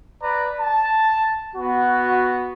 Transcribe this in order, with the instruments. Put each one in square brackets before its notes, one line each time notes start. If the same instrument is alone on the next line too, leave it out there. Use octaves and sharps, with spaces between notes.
[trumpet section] B4 D5 A#5
A5
B3 F#4